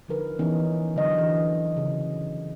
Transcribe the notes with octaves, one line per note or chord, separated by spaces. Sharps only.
D3 F3 D#4 A#4 B4
E3 B3 C#4 D#4
D3 F#3 D#5
E3
C#3